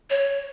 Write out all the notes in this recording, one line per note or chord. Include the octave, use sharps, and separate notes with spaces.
C#5